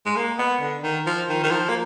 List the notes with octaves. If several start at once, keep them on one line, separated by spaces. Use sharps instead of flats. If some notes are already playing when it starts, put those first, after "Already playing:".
G#3
A#3
B3
D3
D#3
F3
D#3
D#3
F3
A#3